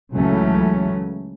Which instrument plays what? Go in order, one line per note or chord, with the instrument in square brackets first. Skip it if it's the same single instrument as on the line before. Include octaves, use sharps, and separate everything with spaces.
[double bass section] C#2 C#3 E3 F#3 A3 C#4